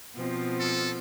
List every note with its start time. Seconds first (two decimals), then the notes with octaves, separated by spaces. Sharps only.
0.14 B2 F3 C4
0.60 A4